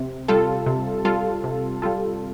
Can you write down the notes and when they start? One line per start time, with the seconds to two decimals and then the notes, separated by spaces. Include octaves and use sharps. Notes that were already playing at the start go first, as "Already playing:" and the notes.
Already playing: C3
0.28 G3 F4 A4
0.66 C3
1.05 G3 F4 A4
1.44 C3
1.82 G3 F4 A4